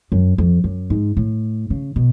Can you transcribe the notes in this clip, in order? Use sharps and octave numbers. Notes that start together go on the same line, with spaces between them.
F#2
F2
F#2
G#2
A2
C#3
B2